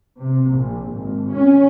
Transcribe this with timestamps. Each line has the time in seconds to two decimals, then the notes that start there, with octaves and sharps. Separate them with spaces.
0.19 C3
0.51 A#1
0.90 G#1
1.31 C#4